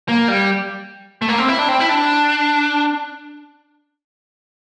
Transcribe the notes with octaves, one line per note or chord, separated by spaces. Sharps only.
A#3
G3
A3
A#3
C4
E4
D4
C4
E4
D4